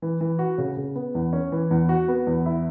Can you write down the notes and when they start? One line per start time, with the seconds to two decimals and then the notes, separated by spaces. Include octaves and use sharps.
0.02 E3
0.21 E3
0.39 F#4
0.58 C#3
0.77 C#3
0.95 B3
1.15 E2
1.33 C#4
1.52 E3
1.71 E2
1.89 F#4
2.08 B3
2.27 E2
2.46 E4